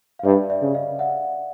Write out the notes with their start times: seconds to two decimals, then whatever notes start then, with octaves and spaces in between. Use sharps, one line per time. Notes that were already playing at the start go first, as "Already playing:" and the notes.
0.19 F5
0.25 G2 D5 E5
0.50 D5 E5
0.62 C#3
0.74 D#5 F5
0.99 E5 F#5